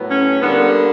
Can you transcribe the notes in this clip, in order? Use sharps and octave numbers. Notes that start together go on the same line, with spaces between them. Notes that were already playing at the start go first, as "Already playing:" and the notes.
Already playing: A2 F#3 B3
C#4
D3 G3 A#3 B3